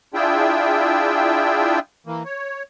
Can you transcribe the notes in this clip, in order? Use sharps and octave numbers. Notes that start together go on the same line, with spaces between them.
D4 E4 F4 G#4 E5 G5
E3 A#3
C#5